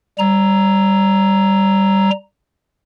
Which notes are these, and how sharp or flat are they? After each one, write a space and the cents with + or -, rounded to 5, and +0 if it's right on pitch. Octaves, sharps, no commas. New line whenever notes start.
G3 +0 A#5 +0